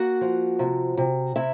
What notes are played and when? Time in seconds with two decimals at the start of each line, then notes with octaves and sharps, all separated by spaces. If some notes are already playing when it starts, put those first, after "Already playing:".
Already playing: A#3 F#4 F#5
0.21 F3
0.59 C3
0.97 C3
1.36 C3 E4 E5